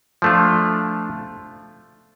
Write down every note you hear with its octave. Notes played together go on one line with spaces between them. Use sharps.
F3 A3 D4 F4